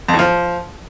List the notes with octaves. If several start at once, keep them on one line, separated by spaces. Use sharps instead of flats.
F2
A2
F3